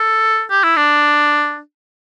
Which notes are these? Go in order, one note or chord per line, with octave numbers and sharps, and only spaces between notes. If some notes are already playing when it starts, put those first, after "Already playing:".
Already playing: A4
G4
E4
D4